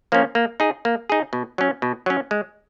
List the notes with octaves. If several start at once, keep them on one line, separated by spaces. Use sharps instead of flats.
F3 A#3 C#4
A#3
D#4 G#4
A#3
D#4 G#4
B2
F#3 C#4
B2
F#3 C#4
G#3